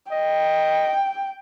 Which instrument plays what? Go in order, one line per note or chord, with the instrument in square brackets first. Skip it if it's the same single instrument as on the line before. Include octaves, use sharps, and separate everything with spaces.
[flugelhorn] D#5 [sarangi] G5